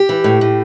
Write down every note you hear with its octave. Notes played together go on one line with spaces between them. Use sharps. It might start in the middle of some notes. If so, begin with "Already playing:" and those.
Already playing: G4
E3
A2
A2